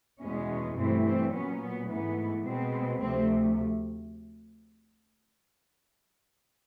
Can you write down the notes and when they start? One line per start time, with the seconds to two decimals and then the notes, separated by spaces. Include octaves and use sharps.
0.21 E2 B2 G#3 B3 C#4
0.77 G2 E3 A3 C4
1.05 C4
1.33 A#2 F#3 B3 C#4
1.61 B3
1.89 G#2 E3 A3 B3
2.45 B2 G#3 B3 C4
3.01 D2 C3 F3 A3 C4